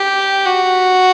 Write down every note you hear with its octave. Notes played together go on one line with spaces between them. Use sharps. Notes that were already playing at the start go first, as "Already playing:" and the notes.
Already playing: G4
F#4